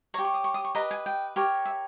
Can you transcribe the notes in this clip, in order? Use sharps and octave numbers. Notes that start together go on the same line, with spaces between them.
G4 C#5 A#5
C#6
D#6
C#6
D#6
C#6
G4 B4 D#5 A#5
G#5
G5
G4 A#4 C#5
E5